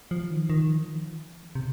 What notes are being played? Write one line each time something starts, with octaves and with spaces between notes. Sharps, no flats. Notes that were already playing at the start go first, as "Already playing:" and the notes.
F3
D#3
D#3
F3
D#3
C3